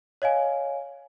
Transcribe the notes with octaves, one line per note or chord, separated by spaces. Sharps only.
C#5 D#5 F5 G#5